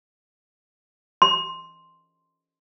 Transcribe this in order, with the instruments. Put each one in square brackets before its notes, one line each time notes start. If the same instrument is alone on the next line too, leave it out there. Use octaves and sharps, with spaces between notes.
[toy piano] C6